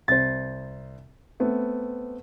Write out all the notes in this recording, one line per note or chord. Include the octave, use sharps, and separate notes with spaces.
C2 C5 A6
A3 B3 C4